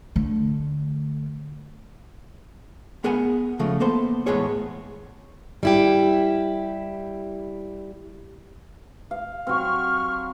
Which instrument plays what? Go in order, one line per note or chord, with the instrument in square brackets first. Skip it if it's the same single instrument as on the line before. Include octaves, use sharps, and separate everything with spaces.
[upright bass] D3 A3
[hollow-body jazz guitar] B3 G#4 A#4 F#5 G#5
C#3 F3 G#3 A3
A#3 B3 A4 C5
E2 A2 G#3 B3 G#4 C#5
[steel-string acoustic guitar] G3 E4 G4
[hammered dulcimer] F5
[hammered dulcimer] F#3 C4 [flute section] C#6 F6